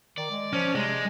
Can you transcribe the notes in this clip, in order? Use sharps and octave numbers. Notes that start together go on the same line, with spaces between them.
D#3 D5
G#3
F3 C#4
C3 G#3